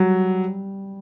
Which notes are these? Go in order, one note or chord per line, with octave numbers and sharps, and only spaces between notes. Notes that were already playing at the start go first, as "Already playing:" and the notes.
Already playing: F#3 G3